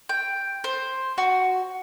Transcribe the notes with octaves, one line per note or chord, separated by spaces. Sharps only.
G5
C5
F#4